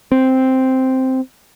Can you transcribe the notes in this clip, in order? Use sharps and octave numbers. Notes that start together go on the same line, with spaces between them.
C4